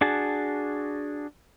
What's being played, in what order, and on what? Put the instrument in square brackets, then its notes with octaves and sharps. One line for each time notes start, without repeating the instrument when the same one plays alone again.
[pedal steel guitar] D4 F#4 G#4 A5